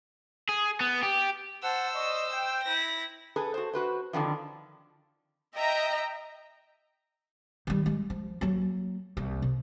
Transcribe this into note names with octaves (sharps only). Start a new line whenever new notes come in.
G#4
B3
G4
C5 F#5 A5 E6
D5 D#5 C#6
G5
E4 A#6
G#4 A4 B4
F#4 C5
F#4 B4 C5
F2 D3 D#3 F3
D#5 E5 G5 A#5
D#3 G3
G#3
F3
F#3 A#3
C2 A#3
C3